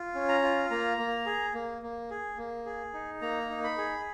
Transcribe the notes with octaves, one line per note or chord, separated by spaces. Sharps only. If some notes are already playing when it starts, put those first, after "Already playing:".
Already playing: F4
C#4
A#5
F4
A#3 A#5
A#3
G#4
A#3
A#3
G#4
A#3
G#4
D#4
A#3 A#5
D#4
B5
G#4